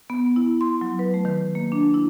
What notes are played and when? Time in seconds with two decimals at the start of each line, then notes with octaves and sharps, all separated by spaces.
0.10 B3
0.36 E4
0.61 C6
0.81 F#3
0.99 B4
1.14 A3
1.25 D#3
1.55 A#3
1.72 D4
1.94 E4